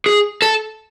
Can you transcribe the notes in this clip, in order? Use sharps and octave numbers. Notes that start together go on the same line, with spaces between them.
G#4
A4